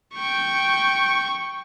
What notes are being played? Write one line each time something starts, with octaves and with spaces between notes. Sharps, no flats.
G5 C#6